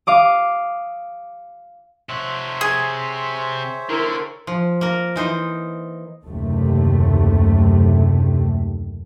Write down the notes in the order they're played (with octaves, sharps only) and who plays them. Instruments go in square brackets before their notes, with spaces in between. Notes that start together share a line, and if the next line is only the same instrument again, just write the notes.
[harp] F5 D6 D#6
[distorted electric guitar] C3 F#5 [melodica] C5 C#5 E5
[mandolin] G#4
[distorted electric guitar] D3 [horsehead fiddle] E4 A#4
[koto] F3
A#3 A#4
E3 D#4 C5
[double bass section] F#1 D#2 C3 A3